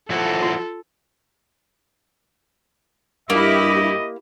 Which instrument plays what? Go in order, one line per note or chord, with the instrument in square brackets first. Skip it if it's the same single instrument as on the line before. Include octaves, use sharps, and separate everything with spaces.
[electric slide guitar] F3 E4 F#4 [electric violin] A4
[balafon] F4
[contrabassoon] G2 [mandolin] A#3 [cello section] E4 G4 [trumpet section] D#5